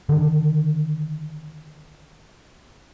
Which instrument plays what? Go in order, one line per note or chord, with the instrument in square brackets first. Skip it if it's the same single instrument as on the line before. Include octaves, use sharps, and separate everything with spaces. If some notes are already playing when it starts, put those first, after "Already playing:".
[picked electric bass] D3 D#3 D4